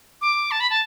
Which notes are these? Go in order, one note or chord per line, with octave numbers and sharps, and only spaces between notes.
D6
A5
B5
A5